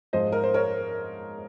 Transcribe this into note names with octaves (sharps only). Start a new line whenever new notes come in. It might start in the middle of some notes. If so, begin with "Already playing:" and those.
G#2 F3 G#3 C5 D#5
A#4
C5
A#4 C#5